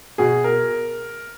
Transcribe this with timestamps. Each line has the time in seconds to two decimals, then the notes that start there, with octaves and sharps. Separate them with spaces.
0.18 B2 G#4
0.44 A#4